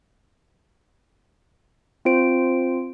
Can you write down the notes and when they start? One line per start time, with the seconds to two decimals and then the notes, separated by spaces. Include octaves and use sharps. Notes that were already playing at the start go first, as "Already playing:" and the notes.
2.05 C4 F4 C5 D7